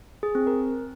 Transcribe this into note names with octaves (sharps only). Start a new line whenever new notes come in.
G#4
C4
A#4